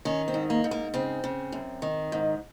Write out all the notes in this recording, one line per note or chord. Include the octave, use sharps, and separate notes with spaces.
D#3 C#4
C4
G#2
A#3
G#2
A#3
C#3 C4
C#3
F#2
D#3
G#2